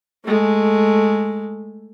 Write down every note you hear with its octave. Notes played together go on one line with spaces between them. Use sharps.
G#3 A3